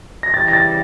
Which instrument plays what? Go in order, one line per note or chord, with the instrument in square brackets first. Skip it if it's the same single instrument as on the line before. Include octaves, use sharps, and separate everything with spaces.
[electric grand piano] A#6
[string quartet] C#3 E3 G3 [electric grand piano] A6
[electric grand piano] A#6
A6